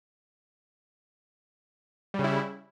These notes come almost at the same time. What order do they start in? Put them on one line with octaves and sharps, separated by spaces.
G3 C#3 E4